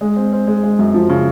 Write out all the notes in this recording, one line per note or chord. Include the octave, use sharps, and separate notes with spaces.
G#3
C4
C4
G#3
G#3
F#2
F3
C#3